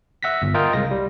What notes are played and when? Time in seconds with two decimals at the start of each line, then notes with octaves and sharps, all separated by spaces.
0.23 E5 F#5 A#6 B6
0.42 G1
0.54 F4 A#4 D#5 G5
0.73 C2 G#3 A#6
0.91 G3